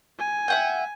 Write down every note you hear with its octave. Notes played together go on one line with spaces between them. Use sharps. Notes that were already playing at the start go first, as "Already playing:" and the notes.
G#5
E5 F#5 G5